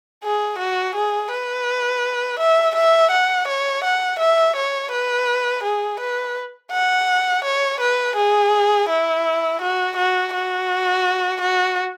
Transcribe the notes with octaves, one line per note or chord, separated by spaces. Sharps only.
G#4
F#4
G#4
B4
E5
E5
F#5
C#5
F#5
E5
C#5
B4
G#4
B4
F#5
C#5
B4
G#4
E4
F#4
F#4
F#4
F#4